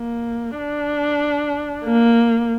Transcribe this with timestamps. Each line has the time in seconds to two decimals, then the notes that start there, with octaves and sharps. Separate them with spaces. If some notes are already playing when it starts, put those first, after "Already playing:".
Already playing: A#3
0.58 D4
1.86 A#3